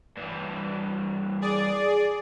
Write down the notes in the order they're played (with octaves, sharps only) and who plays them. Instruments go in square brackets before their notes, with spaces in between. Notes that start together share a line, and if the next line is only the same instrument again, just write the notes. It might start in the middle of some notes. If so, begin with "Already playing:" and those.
[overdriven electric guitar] G2 E3
[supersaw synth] G#4 D5